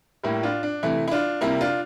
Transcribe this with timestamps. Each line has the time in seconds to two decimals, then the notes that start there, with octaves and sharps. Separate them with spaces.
0.23 A2 G3 A#3 E4
0.43 D4 F4
0.63 D4
0.83 C3 E3 A3 E4
1.08 E4
1.11 D4 F4
1.41 C3 G3 A#3 E4
1.61 D4 F4